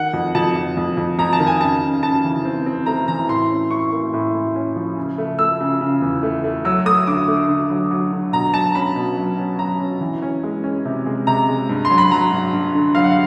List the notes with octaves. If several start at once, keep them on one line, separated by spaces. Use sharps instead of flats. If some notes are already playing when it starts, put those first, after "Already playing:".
Already playing: D#3 F#5
F2
F2 A5
F2
F2
F2
F2 A#5
A5
D#3
G#5
C#3 A5
C#3
C#3 A5
E3
C4
C4
A3 A#5
E3 A#5
A2 C6
C#4
A2 C#6
A#3
A2
A2
C#4
F3
C#3
A3
A3 E6
C#3
C#3
E2
A3
A3
F#3 E6
A3 D#6
D3 D6
A3
D3
F#3
F#3
D3
B2 A#5
F#3 A5
A#5
C#4 B5
B2
F#3
C#4
F#3 A#5
C#4
E3
C#4
G#3
C#4
C3
G#3
C3 A#5
G#3
G2
C6
F#3
B5
F#3 A#5
G2
G2
D3
F#3 F5
F#5
F5